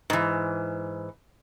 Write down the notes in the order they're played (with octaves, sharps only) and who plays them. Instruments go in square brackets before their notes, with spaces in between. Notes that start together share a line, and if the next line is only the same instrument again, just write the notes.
[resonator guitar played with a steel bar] G#2 E3